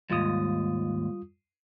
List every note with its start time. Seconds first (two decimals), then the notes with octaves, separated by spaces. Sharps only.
0.10 D#2 G#2 G3 F4 D#6